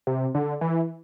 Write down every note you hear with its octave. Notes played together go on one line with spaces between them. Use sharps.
C3
D3
E3